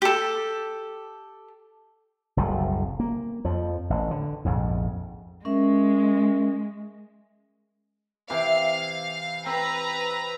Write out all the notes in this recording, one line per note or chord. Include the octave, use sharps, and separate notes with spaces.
G4 A4
F#1 C2 A2
A#3
F2 F3
A1
D3
A#1 F2 G#2
G#3 C#4 A#4 E5
C3 E3 F5 D6
C4 B4 A#5